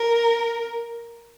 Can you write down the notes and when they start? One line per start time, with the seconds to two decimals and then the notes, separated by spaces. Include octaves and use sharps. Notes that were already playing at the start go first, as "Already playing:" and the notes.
Already playing: A#4